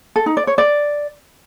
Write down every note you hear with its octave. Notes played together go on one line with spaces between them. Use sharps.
A4
D#4
D5
C#5
D5